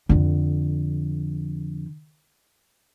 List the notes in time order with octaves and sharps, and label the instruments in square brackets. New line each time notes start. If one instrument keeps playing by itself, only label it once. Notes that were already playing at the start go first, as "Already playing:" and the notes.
[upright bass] F2 D3